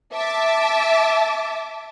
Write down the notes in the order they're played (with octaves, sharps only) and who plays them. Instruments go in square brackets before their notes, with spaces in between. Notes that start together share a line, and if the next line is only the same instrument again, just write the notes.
[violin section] E5 A5 D6